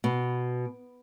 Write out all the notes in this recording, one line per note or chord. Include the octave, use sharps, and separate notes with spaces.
B2